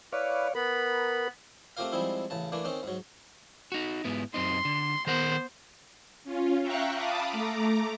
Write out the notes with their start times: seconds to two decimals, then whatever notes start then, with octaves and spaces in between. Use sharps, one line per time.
0.13 E4 B4 C#5 D5 F5
0.55 B3 A#4 B5
1.77 A3 C4 F4 G4 A#4 F5
1.92 F3 G3 G#3 C4 D#4 E4
2.30 A1 C#3 A5
2.52 E3 A3 A#3 D4
2.65 D#3 C4 C#4 D#4
2.83 G#2 F#3
3.72 D#4 F#4
4.04 G#2 B3 E4
4.34 F#2 C4 D#4 C6
4.65 D3
5.07 D#3 B3 A#4 C5 F#5
6.24 C#4 F4
6.62 E5 F5 G5 A#5 C#6 F#6
6.94 F5 A5 B5 D6 D#6
7.32 A3 A#5 D6